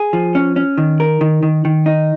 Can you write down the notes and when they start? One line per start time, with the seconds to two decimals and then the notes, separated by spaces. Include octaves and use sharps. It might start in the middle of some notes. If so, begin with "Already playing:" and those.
Already playing: G#4
0.13 F3
0.35 C#4
0.56 C#4
0.78 D#3
1.00 A#4
1.21 D#3
1.43 D#3
1.65 D#3
1.86 D#4